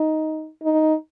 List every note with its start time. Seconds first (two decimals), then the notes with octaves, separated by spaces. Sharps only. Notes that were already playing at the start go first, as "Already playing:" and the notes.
Already playing: D#4
0.63 D#4